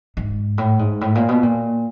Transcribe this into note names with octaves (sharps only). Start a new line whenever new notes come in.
G#2
A2
G#2
A2
A#2
B2
A#2